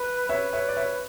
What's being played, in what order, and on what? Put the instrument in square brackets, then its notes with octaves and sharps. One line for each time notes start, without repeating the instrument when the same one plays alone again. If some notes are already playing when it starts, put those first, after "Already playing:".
Already playing: [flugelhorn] B4
[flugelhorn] B4 [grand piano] C#5 E5
[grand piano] C#5 E5
D5
C#5 E5